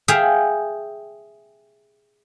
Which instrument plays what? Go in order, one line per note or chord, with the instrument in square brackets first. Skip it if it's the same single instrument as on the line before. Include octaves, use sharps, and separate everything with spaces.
[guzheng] G#4 E5 F5 G5